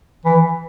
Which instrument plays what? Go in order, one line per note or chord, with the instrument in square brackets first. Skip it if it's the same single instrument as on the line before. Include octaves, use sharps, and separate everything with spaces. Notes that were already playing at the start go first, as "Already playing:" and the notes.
[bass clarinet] E3